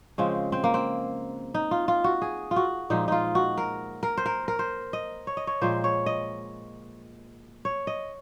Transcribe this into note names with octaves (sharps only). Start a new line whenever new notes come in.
C#3 F3 G#3 C4
C4
A#3
C4
D#4
F4
F4
F#4
G#4
F4
F#4
A#2 F3 G#3 D#4
D#4 F4
F#4
A#4
A#4
C5
A#4
A#4
C5
D#5
C#5
D#5
C#5
A#2 F3 G#3 C5
C#5
D#5
C#5
D#5